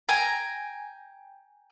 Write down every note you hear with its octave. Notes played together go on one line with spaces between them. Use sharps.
G5 G#5 A#5